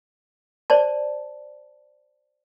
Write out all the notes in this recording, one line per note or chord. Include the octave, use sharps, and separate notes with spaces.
C5 D5 A5